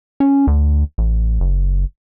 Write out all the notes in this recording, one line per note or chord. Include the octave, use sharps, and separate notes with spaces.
C#4
D2
A1
F#1